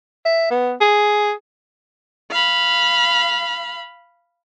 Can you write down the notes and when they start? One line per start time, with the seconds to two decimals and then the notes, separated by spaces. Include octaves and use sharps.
0.25 E5
0.51 B3
0.81 G#4
2.31 F5 B5